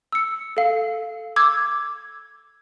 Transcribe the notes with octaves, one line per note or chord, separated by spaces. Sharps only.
E6 C#7
A4 F5
D6 E6 G#6